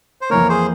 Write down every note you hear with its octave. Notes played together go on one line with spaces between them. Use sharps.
C5
F2 E3 A#3 A#4 C#5
G#4 C5